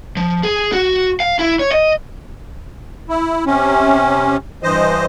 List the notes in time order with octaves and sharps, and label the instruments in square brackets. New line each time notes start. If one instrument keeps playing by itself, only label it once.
[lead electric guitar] F3
G#4
F#4
F5
E4
C#5
D#5
[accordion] E4
C3 C#4
G2 E3 C5 D#5